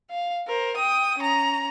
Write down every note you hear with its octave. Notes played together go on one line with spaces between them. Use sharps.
F5
A#4 C5
G5 D#6
C#4 A#5